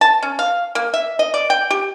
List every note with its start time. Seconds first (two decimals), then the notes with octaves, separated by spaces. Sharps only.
0.01 A5
0.23 C#4
0.39 F5
0.75 A#3
0.94 E5
1.19 D#5
1.34 D5
1.50 G5
1.70 G4